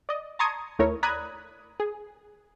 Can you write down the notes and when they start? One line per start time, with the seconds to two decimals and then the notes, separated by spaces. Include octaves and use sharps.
0.09 D5 D#5
0.39 A5 A#5 C6 C#6 D#6 G#6
0.79 D#2 A3 E4 A#4 C#5
1.03 D5 A#5 B5 D#6 F#6 G#6
1.80 G#4